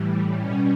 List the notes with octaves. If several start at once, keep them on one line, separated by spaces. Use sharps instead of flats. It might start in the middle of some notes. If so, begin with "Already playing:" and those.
Already playing: A2 E3 G3
B2 G3 C#4